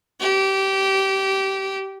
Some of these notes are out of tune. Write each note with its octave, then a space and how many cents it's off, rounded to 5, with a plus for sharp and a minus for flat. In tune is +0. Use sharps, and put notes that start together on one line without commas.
G4 -20